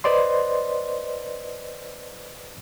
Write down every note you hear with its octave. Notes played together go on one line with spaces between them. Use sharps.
B4 C5 D5 D#5 C6